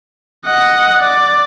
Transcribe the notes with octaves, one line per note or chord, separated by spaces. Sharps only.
D#5 F#5
D5